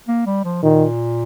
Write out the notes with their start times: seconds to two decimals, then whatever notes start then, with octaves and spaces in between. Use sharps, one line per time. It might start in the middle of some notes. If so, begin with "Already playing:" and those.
0.08 A#3
0.26 G3
0.45 F3
0.63 A#2 D#3